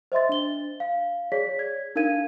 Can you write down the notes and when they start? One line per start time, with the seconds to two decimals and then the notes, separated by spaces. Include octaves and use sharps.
0.12 C5 D#5 E5 C6 A6
0.29 D4 G7
0.80 F5
1.32 G#4 C#5 D5 B6
1.59 G#6
1.96 D4 D#4 A#4 F5 G#6 D#7